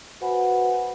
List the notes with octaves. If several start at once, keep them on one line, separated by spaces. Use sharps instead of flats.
F#4 B4 C5 F#5 G#5 B5